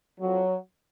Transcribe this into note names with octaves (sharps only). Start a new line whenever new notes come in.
F2 F3 F#3